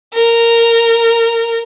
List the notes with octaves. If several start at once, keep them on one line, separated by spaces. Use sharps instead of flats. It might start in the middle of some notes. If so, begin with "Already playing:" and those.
A#4